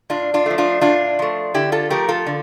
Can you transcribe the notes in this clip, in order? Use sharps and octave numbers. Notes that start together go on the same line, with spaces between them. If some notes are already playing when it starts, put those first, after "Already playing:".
A2 D4 F4
D4 F4
F3 A3
D4 F4
A2 D4 F4
F3 A3
D3 E4 G4
F4 A4
F3 A3 G4 A#4
F4 A4
D3